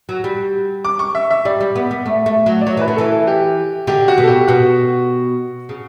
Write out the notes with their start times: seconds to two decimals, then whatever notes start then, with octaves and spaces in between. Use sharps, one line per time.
0.09 F#3
0.24 G3
0.85 D6
0.99 C#6
1.15 E5
1.31 E5
1.45 G3 D5
1.60 G3
1.76 B3
1.91 B3
2.06 A3
2.26 A3
2.46 F#3
2.61 D5
2.66 F#3 C#5
2.77 E3 B4
2.88 D3
2.96 E3 A4
3.12 A4
3.27 G4
3.87 D3 G4
4.08 F#4
4.18 B2
4.23 A4
4.27 G4
4.48 B2 F#4
5.69 C#3